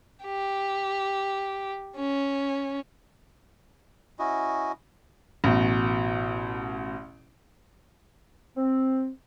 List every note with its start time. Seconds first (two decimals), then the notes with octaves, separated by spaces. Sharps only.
0.24 G4
1.97 C#4
4.19 C#4 E4 F#4 D#5
5.44 A1 B2
8.57 C4